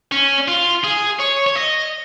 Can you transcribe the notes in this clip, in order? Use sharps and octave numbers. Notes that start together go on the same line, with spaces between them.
C#4
F4
G#4
C#5
C#5
D#5